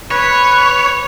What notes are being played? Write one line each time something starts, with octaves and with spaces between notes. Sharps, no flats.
B4 C#5